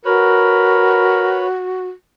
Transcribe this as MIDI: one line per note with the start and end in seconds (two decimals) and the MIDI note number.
0.05 1.87 66
0.05 1.48 70
0.05 1.47 71
0.05 1.47 73
0.05 1.47 83